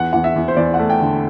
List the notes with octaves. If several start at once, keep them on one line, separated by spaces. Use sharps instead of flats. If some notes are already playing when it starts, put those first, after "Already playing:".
Already playing: E2 F#5
E2 F#5
E5
E2
C5
E2 D5
F#5
A3
G5
D3